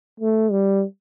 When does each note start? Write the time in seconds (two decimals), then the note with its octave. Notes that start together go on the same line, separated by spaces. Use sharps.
0.20 A3
0.51 G3